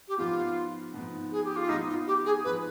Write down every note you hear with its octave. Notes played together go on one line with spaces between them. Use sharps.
G4
G#2 F3 B3 F4
G#2 F3 B3
G#4
G4
F4
G#2 F3 B3 D#4
F4
G4
G#4
G#2 F3 B3 B4